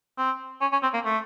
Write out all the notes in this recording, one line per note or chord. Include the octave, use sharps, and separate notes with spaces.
C4
C#4
C#4
C4
A#3
A3